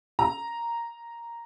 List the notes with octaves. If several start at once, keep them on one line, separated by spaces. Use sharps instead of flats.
A#5